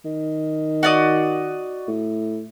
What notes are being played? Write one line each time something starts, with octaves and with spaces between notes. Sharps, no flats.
D#3
F#4 D5 D#5
A2